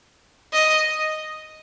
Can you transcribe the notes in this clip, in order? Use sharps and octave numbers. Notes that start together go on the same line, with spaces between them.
D#5